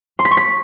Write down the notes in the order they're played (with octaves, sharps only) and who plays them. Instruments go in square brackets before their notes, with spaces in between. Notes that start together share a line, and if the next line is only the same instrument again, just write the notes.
[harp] C6
B6
C#6
B6